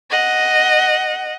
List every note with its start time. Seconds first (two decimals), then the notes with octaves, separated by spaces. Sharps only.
0.11 D#5 F#5